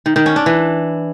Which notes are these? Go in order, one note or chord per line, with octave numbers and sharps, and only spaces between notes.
D#3
D#3
C#4
D4
E3